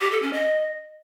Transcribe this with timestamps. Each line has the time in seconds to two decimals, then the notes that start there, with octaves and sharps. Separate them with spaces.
0.01 G4
0.11 A4
0.22 C#4
0.33 D#5